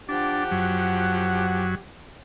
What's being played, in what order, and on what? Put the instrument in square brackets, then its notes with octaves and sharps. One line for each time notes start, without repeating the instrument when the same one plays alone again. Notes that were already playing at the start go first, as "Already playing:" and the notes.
[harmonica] F3 G4 F#5 [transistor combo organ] D4
[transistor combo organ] F#2 F#3